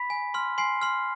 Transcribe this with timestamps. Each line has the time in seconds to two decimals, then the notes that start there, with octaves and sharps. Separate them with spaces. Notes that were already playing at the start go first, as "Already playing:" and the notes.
Already playing: B5 B6
0.10 G#5
0.34 C6 F6
0.58 G#5 C6 C7
0.81 C6 F6